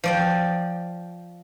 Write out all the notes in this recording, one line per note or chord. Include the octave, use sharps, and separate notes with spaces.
F3 D5 G5